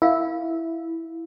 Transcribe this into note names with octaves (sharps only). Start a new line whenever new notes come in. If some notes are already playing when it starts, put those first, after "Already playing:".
E4 A#4 E5 F5